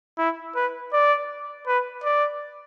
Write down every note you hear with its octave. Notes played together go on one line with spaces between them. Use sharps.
E4
B4
D5
B4
D5